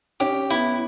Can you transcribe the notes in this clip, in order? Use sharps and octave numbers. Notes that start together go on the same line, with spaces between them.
C#4 G4
B3 E4